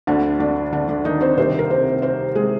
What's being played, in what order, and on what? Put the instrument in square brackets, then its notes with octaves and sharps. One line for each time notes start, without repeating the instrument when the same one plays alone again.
[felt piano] D2 D3 D4
D3 D4
D3 D4
D3 D4
D#3 D#4
C4 C5
C2 C3 D#3 C4 C5
A#4
C4 C5
C4 C5
G#3 G#4